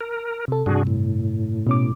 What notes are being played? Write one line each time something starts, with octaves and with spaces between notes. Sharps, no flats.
A#4
C3 A4
G2 C3 D4 F#4 G#4
A2
B2 C#4 D6